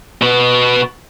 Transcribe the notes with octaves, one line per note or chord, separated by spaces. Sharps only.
B2 B3